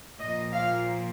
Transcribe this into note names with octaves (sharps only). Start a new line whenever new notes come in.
A#2 F3 A#3 D#5
F5